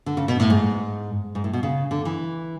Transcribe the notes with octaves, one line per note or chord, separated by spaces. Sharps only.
D3
C#3
B2
A2
G#2
G#2
A2
B2
C#3
D3
E3